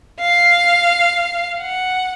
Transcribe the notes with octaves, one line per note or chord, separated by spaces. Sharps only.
F5
F#5